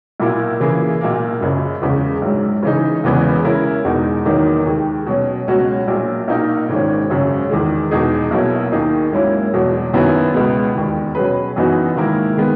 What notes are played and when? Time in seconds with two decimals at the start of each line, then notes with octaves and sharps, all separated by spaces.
0.20 B1 A#2 A#3 E4
0.60 C#3 E3 A#3 E4 G#4
1.01 B1 A#2 A#3
1.41 F#1 F#2 C#3
1.81 E2 C#3 G#3
2.22 A#1 G#2 F#3
2.63 C#3 E3 G#3 D#4
3.03 E1 E2 C#3 E3 B3
3.44 C#3 G#3 C#4 E4 A#4
3.85 E1 E2 B2 G#3 D#4
4.25 E2 D#3 F#3 A#3 D#4
4.66 D#2 D#3 G#3
5.06 B2 F#3 C#4
5.48 C#2 B2 F#3 C#4 F#4
5.87 A#1 A#2 F#3
6.28 B1 A#2 A#3 D#4 A#4
6.68 G#1 G#2 D#3 G#3 C#4
7.09 G#1 F#2 C#3 F#3 C#4
7.50 E2 D#3 G#3
7.91 E2 B2 G#3 D#4 G#4
8.31 B1 B2 F#3 A#3 E4
8.72 D#2 D#3 A#3 D#4 G#4
9.13 G#2 F#3 A#3 C#4 E4
9.53 E1 E2 B2 F#3
9.93 F#2 D#3 F#3 B3 E4
10.34 C#2 B2 G#3 B3
10.75 E1 D#2 D#3
11.15 B2 F#3 C#4 G#4 B4
11.56 F#2 E3 B3 D#4 F#4
11.96 G#2 D#3 A#3 E4 A#4
12.37 D#3 G#3 B3